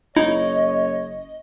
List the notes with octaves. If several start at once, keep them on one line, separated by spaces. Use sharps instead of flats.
F#1 D#4 E4 C#5 D#5